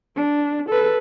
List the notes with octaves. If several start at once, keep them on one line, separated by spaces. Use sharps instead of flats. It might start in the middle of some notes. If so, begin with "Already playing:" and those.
D4
A4 B4